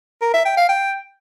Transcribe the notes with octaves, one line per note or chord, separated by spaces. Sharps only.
A#4
E5
G5
F5
G5